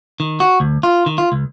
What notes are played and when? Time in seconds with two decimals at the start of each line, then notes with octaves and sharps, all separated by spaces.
0.20 D#3
0.40 F#4
0.60 D2
0.83 F4
1.06 D#3
1.18 F4
1.32 C#2